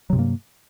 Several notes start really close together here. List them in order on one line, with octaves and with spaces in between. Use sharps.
F#3 C3 G2 A#3